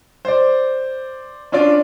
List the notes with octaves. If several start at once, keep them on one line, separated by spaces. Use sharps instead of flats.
C5 D5
C#4 D4 F4 D5